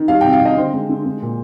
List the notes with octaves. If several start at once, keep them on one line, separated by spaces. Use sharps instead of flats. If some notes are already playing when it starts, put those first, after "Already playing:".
Already playing: D#3
G3 F5
C3 G5
F5
C3 D#5
D3 C5
G#3
D3
G#3
A#2